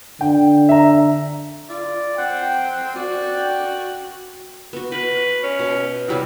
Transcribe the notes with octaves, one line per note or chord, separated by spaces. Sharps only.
D3 G5
E5 A#5
F4 D5
C4 F#5 G5
F#4 D5 G5
B3 F#4
F#4 B4
C#4
B2
C3 F#3 G3 E4